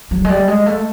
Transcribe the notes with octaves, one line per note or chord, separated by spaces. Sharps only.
F#3
G#3
G3
G#3
A3